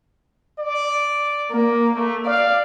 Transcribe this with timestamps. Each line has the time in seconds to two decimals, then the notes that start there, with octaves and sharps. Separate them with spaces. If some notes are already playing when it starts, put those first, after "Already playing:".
0.59 D5
1.52 A#3
1.96 A3
2.25 D5 F5